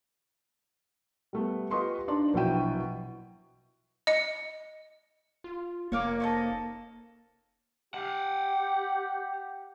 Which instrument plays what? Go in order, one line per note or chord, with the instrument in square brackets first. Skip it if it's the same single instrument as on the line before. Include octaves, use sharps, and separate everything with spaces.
[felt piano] G3 A3 B3
F4 G4 B4 D#5 C6 C#6
D4 D#4 D5 C6
A#1 B2 F#3 E4 G5 D#7
[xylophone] D#5 C#7
[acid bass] F4
[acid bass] F1 [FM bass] A#3 [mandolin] C#5 F5 D6
[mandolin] C#4 D#4 A4
[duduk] G4 [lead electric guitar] F5 F#5